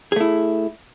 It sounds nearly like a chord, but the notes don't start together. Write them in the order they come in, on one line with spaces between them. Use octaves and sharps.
G#4 A3 E4